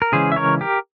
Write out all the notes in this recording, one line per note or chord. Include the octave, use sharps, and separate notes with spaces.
A#4
C#3 E3 G#3 C#4 G#4 C5
E5
A#4 C#5
G4 A#4